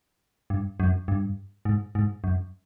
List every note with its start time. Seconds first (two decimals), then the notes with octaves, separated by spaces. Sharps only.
0.50 G2
0.80 F#2
1.08 G2
1.65 G#2
1.95 G#2
2.24 F#2